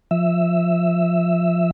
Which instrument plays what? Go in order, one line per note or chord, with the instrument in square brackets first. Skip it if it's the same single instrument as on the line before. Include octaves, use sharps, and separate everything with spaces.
[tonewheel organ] F3 E5 E6